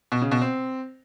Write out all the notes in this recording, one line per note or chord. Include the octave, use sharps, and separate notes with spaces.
B2
C#3
B2
C4